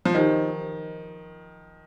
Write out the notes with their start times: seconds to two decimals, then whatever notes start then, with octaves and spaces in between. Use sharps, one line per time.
0.05 F3
0.14 D#3 D#4 G4 C5 D#5